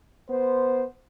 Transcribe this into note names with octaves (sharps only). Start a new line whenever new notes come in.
B3 C5